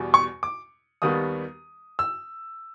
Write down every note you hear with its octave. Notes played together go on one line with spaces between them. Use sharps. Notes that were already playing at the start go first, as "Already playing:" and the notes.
Already playing: E2 B2 G3
C#6
D6
D#2 D#3 G3 B3 D#6
E6